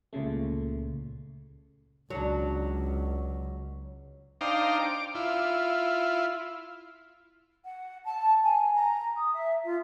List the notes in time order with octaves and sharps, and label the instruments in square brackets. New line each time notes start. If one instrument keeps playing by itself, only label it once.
[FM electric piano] C#2 A#2 C#3 A3
[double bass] C#2 [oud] F#3 D4
[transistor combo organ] D4 D#4 C5 F5 G5 A#5
D6
E4 F4
[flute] F#5
A5
G#5
A#5
D#6
E5
F4